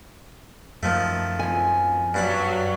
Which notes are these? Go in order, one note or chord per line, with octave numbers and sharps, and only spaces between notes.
F#2 D#3 F3 A3
F2 G#5
G2 F#3 D4 B5